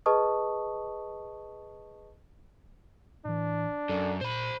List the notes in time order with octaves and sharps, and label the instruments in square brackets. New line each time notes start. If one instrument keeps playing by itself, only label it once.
[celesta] G#4 B4 D#5 A5 C#6 D#6
[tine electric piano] A2 E3 [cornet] D4
[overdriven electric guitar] F#2 [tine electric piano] A4 D5
[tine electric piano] A#2 [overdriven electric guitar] C5 B5